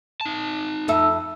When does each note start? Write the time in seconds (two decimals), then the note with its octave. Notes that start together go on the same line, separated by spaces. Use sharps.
0.21 D#4 A5
0.88 F2 A4 E5